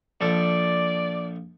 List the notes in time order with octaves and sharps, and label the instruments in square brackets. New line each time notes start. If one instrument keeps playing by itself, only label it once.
[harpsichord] A#1 F3 A4 [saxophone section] D5